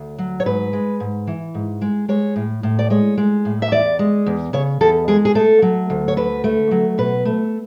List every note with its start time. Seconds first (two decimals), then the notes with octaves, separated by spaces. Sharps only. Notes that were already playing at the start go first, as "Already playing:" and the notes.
Already playing: D2
0.19 F#3
0.40 C#5
0.46 G#2 B4
0.73 G#3
1.00 G#2
1.27 E3
1.54 G#2
1.81 G#3
2.09 G#3 C#5
2.36 A2
2.63 A2
2.79 D5
2.90 G#3 C#5
3.17 G#3
3.45 A2
3.62 E5
3.72 E2 D5
3.99 G#3
4.26 E2
4.53 C#3 C#5
4.81 E2 A4
5.08 G#3 G#4
5.25 G#4
5.35 A3 A4
5.62 F#3
5.90 D2
6.08 C#5
6.17 D3 B4
6.44 A3
6.71 F#3
6.98 B2 B4
7.25 A3